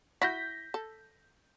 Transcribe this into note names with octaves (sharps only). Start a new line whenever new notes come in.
E4 F#4 G6 A#6 B6
A4